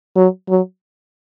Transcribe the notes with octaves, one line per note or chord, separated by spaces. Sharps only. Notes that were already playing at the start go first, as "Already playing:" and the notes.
F#3
F#3